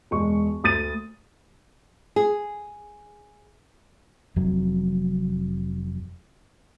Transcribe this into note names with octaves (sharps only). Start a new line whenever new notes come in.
E1 G#3 C#6
D2 D#6 A6 D#7
G#4
F1 F2 F#3